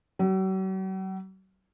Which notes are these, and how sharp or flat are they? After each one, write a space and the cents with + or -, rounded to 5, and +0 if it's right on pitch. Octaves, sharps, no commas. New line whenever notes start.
F#3 +45